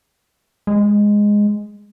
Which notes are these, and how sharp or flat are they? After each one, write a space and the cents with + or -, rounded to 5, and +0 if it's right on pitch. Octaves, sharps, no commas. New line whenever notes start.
G#3 -5